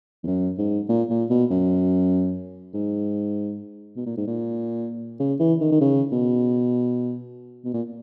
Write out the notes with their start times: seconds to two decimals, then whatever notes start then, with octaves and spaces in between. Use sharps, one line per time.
0.23 E2
0.27 F#2
0.58 G#2
0.89 A#2
1.10 A#2
1.30 B2
1.51 F#2
2.74 G#2
3.96 B2
4.06 A#2
4.17 G#2
4.27 A#2
5.19 C#3
5.40 E3
5.60 D#3
5.72 D#3
5.81 C#3
6.12 B2
7.65 B2
7.74 A#2